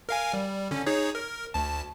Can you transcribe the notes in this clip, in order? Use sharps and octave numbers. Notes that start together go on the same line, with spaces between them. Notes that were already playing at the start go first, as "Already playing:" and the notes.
A#4 F5 G#5
G3
D3 C#4
D#4 G#4 C#5
A#4
D2 A5